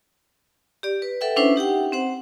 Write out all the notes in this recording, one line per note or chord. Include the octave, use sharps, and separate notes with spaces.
G4 D5
B4
A4 B4 E5 F#5 G5
C#4 D4 E4 B4 C5 E5
D#4 G4 F#5 G5
C4 C5 F#5